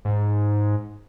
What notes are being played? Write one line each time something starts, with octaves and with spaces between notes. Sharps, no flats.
G#2